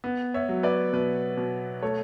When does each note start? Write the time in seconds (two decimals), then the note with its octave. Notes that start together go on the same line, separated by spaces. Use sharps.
0.04 B3
0.34 C#5 E5
0.49 F#3
0.63 B4 D5
0.93 B2 B4
1.37 B2
1.82 A3 A4 C#5